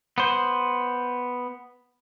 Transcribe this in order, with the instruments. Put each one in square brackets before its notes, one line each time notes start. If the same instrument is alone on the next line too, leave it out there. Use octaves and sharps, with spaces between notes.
[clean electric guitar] B3 C5